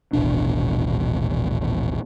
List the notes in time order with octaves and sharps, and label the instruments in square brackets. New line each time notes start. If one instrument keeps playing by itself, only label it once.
[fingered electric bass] D#1 A1 B2 D4